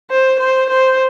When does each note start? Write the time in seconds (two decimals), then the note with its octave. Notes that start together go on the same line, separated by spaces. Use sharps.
0.10 C5
0.39 C5
0.69 C5